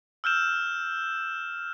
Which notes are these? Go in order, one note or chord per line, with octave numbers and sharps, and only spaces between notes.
E6 F6 G6 E7